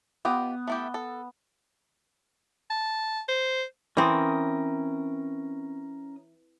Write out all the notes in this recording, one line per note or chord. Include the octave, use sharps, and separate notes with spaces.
B3 F4 G4 D#5
A3 E4 G4
A4
A5
C5
E3 C4 C#4 A#4 D#6